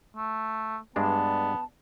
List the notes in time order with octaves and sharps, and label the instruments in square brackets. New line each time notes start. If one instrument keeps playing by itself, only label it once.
[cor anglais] A3
[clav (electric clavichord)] G2 G#3 D4 [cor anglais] B3 [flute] A5